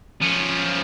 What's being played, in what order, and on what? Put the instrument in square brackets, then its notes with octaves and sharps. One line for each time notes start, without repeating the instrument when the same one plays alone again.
[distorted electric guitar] F3 C#4